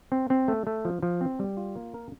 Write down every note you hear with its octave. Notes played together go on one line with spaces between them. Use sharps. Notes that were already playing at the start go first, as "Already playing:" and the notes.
C4
C4
A3
A3
F3
F3
C4
G3
F4
A#3
A#4